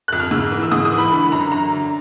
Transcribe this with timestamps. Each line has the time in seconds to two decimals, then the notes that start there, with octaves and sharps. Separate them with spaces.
0.08 F2 F#6
0.20 F6
0.31 G#2 E6
0.52 E3
0.63 E6
0.72 G#2 D#6
0.85 D#6
0.92 E3
0.98 B5
1.11 D3 B5
1.32 F#2 A#5
1.51 D3 A#5
1.72 D3